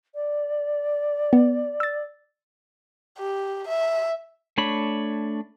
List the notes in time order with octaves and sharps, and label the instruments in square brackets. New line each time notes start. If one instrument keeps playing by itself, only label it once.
[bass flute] D5
[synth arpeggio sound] B3
E6 A6
[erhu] G4
E5
[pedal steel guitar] A3 D4 C#5 B5